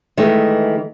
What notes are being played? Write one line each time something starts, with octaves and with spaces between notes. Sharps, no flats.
D#3 E3 G#3 A3